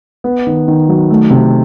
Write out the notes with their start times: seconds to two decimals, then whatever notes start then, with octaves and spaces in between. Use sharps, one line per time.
0.24 B3
0.47 D#3
0.68 D#3
0.89 F#3
1.10 A3
1.30 C3